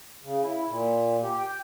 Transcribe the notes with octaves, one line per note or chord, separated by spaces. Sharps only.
C#3
E4
A#2
G4
G5